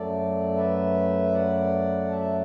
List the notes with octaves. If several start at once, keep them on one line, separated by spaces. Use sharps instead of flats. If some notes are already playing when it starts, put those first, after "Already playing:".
Already playing: F#2 F#3 A3 A4 D5
B4 E5
D5 F#5
E5 A5